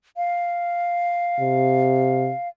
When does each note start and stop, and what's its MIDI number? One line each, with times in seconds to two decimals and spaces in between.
0.17 2.48 77
1.40 2.32 48